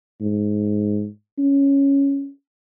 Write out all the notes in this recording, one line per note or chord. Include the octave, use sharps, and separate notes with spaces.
G#2
C#4